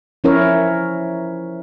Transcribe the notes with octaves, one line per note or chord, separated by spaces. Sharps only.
F3 C#4 E4 A#4 C#5 E5